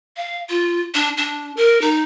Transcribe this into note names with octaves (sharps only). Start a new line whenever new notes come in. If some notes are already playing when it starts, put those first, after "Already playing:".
F5
F4
D4
D4
A#4
D#4